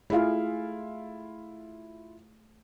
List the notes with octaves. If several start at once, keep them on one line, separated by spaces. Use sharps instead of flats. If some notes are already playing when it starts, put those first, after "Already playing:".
A3 E4 F4 G#4 F5